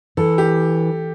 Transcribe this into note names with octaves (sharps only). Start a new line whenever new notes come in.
E3 A4
G4